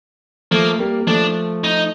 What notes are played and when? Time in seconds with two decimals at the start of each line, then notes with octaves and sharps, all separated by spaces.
0.51 F3 A3 A#3
0.79 G3 A#3
1.00 A#3
1.07 F3 A3 D4
1.64 D#4